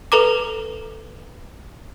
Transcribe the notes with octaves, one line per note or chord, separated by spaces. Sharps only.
A4 B4 A#5 D6